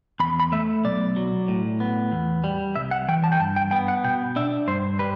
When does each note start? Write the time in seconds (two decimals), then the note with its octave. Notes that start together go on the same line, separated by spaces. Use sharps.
0.20 E2 B5
0.40 B5
0.52 A3 E5
0.85 B1 D5
1.16 F#3
1.48 A2
1.80 B3
2.12 E2
2.44 G3
2.76 C2 E5
2.91 F#5
3.08 E3 G5
3.24 A5
3.32 G5
3.40 G2 A5
3.56 G5
3.71 B3 G5
3.88 F#5
4.04 B2 G5
4.36 D4 E5
4.67 G2 C5
4.99 G3 B4